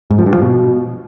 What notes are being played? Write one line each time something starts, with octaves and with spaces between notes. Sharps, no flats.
G#2
F3
G2
F3
B2